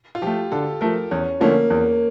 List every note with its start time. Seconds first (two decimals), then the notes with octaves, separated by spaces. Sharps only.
0.15 F4
0.22 F3 G4
0.27 A3
0.52 D3 A4
0.81 F3 A3 A#4
1.11 E2 C#4
1.40 D3 F3 A3 A#3 C#4
1.70 E2